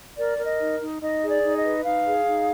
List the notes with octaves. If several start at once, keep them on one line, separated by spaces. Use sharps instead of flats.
A#4 D5
A#4
D#5
D#4
D#4
D#4 D#5
G#4
D5
D#4
D#5
B4
D#4 F5
G#4
D#4